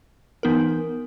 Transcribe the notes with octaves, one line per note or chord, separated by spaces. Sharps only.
E3 B3 D#4 A#4